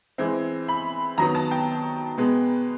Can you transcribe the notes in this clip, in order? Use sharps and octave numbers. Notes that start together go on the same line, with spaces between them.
E3 G#3 C4
B5
D#3 F#3 B3 A#5
A5
G5
B2 G#3 B3